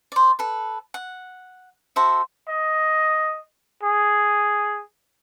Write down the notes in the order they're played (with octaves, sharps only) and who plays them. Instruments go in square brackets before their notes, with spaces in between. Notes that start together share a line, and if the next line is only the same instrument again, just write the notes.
[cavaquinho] C5 D5
A4 B4
F#5
F#4 A4 C5 E5
[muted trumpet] D#5
G#4